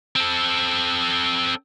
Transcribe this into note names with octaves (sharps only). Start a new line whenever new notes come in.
C4 A4